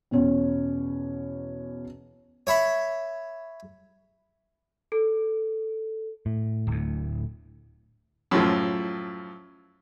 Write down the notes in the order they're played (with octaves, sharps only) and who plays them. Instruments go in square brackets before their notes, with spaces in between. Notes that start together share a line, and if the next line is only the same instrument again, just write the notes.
[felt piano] E2 B2 C#4
[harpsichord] C#5 E5 B5
[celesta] A4
[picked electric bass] A2
[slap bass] D1 D2
[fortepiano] F#2 A2 F3